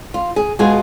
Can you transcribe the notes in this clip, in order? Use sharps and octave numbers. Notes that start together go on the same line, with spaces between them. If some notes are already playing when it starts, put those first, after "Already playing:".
F4
G#4
B2 G#3 B3 F4 G#4